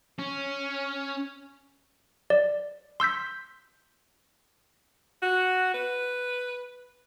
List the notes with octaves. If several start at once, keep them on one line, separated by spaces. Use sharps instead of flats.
C#4
D5
C6 E6 G6 B6
F#4
B4